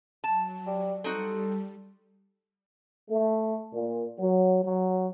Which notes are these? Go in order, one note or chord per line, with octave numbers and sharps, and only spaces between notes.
F#3 A5
G3
G3 C4 D#4 F#4 A4
A3
A#2
F#3
F#3